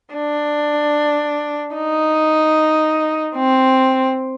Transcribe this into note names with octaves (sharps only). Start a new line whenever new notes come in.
D4
D#4
C4